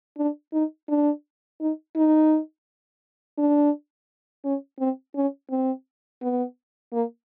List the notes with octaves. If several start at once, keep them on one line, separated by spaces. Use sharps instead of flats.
D4
D#4
D4
D#4
D#4
D4
C#4
C4
C#4
C4
B3
A#3